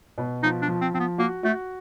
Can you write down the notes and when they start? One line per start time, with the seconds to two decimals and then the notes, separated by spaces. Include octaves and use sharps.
0.18 B2
0.43 F3 D#4
0.62 D4
0.68 F3
0.81 C4
0.94 F3 C4
1.00 B3
1.18 A#3 F#4
1.43 A3 F#4